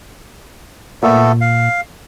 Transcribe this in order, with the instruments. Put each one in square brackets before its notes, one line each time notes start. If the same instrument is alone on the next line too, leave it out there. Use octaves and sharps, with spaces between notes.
[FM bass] A#2 [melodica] A3 B3 A4
[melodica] F5